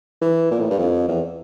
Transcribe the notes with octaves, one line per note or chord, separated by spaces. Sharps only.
E3
A#2
A2
G2
F2
E2